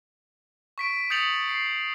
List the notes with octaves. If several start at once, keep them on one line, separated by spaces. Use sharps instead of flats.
C#6 B6 D7
D#6 G6 A6 C#7 F7 F#7
C7